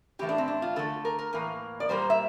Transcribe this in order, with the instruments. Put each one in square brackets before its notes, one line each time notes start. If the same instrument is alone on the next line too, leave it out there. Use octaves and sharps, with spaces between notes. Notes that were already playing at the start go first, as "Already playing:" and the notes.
[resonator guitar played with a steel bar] A2 E3 A3 G4
D4
C4
D4
F4
D3 A3 A4
A#4
A#4
A2 E3 A#3
D5
A#2 G3 A#3 C5
E5